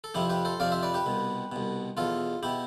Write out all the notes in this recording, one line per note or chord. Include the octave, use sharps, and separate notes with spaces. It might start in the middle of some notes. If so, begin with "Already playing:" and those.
A4
F2 C3 F3 E4 G4
G4 B4
A4 C5
F2 C3 F3 D5 F5
C5 E5
B4 D5
G4 B4
C2 B2
C2 B2
E2 B2 F4 A4
B2 E4 G4